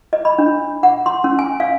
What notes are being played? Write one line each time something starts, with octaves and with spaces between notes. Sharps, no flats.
D#5
B5
D4
F#5
C6
C#4
G#5
F5